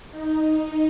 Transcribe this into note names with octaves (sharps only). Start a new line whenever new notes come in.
D#4